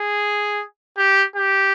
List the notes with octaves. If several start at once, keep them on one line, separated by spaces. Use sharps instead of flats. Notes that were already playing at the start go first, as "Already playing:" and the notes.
Already playing: G#4
G4
G4